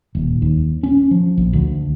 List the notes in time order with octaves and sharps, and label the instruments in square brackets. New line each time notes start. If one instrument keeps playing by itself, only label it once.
[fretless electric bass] D#1
D#2
C#4
F3
A#1
D2